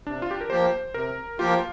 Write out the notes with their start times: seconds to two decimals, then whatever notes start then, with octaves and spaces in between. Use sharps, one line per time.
0.06 C3 D4
0.22 F4
0.31 G4
0.41 A#4
0.50 F3 A#3 G4 C5
0.94 C3 A#4
1.39 F3 A#3 F4 G4